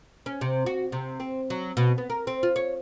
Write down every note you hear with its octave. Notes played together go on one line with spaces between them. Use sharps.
C#4
C3
F#4
C3
C4
F#3
B2
B3
A#4
C4
F4
C#5